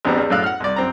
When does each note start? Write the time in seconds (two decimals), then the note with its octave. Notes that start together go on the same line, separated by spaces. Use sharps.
0.05 A1 E2 B3 C4 D4 A#5
0.18 E2
0.30 F#2 A2 A4 F5 F#6
0.44 F#5 F6
0.60 C2 D5
0.76 F#2 C4 A#5